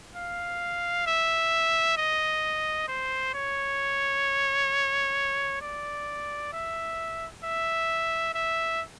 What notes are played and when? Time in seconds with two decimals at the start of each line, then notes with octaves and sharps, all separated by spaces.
0.15 F5
1.07 E5
1.98 D#5
2.88 C5
3.34 C#5
5.62 D5
6.53 E5
7.44 E5
8.34 E5